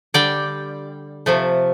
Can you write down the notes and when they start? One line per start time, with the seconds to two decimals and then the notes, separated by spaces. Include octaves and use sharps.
0.14 D3 G3 D5 G5
1.26 C3 F3 A3